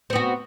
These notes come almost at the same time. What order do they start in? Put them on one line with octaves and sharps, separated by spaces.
C4 B3 F#4